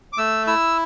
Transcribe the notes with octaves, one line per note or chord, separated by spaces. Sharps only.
D6
A3 E6
E4 E6